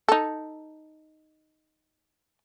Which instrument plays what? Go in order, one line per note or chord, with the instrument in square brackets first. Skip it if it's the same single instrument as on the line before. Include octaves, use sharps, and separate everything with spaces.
[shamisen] D#4 A4